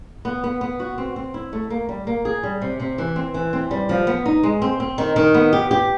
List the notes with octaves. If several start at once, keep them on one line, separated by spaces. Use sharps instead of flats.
B3
B3
B3
F#4
C4
C4
E4
A3
A#3
G3
A#3
G#4
G3
C3
C3
E3
C4
E3
C4
G3
F3
B3
D#4
G#3
C4
C4
D#3
D#3
B3
G4
G4